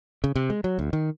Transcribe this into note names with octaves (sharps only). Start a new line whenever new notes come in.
C#3
C3
G#3
F#3
D2
D#3